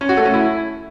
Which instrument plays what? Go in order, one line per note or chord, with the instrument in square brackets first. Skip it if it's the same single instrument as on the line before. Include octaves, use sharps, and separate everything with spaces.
[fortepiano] C#4
F#4
A3
C#4
E4